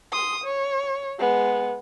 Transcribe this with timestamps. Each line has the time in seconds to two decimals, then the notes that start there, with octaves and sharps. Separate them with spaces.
0.12 C6 D#6
0.44 C#5
1.19 G#3 B3